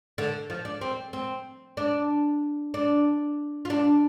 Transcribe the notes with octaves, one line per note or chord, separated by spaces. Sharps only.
D3
F3
D4
C4
C4
D4
D4
F4
D4